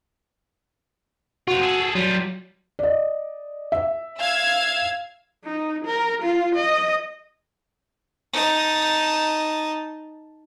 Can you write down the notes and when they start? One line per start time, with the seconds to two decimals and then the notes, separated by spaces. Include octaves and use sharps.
1.48 C3 F4 F#4
1.61 G#4 A4
1.95 F#3 G3 F4
2.79 D5 D#5
3.72 E5
4.19 F5 E6 G#6
5.44 D#4
5.84 A#4
6.22 F4
6.55 D#5
8.33 D#4 A5